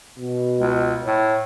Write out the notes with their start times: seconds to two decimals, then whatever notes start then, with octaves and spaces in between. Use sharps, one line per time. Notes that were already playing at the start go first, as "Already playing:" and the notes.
0.18 B2
0.60 C#2
1.05 A2